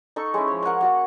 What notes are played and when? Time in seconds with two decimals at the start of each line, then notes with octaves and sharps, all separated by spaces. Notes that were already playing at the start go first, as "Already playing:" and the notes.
0.16 D#4 A4 C#6
0.34 G#3 C#4 E4
0.48 F3 C#5
0.63 A#4 F#5 G#5 A#5
0.81 A#3 F#4 A5